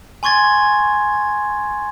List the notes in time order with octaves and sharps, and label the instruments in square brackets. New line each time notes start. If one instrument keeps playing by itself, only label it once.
[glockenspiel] G#5 C6 C#6 G#6 A6